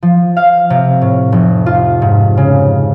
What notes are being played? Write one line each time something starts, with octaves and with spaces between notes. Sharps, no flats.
F3
F5
C3
A2
F1
F4
G#2
C#3